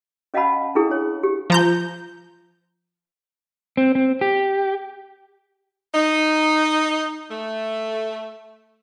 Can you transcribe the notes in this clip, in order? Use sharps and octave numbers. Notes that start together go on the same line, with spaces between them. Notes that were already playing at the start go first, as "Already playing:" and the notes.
C#4 D#5 F5 F#5 A5 B5
D4 E4 G#4 A4
C#5
G4
F3 A#5 G6
C4
C4
G4
D#4
A3